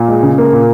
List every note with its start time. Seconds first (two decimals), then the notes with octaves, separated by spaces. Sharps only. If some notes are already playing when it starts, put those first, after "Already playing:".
Already playing: A#2
0.08 G#3
0.23 C#3
0.38 A#3
0.53 A#2